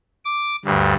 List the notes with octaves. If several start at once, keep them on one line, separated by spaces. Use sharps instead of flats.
D6
D2 G2